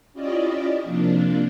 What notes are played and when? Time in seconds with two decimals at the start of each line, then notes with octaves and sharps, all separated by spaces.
0.13 C#4 E4 F4 G4 D5 D#5
0.84 C3 F3 A#3 D4 F4